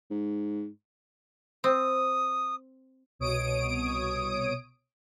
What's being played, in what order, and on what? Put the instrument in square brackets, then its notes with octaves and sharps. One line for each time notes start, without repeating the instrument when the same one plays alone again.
[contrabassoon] G#2
[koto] C4 [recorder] D#6
[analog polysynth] C2 B2 C#5 D#6 D7